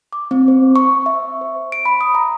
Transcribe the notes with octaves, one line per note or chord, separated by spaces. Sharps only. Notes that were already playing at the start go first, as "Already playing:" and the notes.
D6
C4
C5
C#6
E5
C5
D7
B5
D#6
A#5